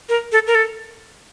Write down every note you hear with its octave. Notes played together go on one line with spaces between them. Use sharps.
A#4
A4
A#4
A4